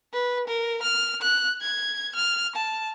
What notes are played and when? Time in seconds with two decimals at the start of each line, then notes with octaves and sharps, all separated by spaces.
0.13 B4
0.47 A#4
0.82 F6
1.22 F#6
1.62 G#6
2.15 F6
2.56 A5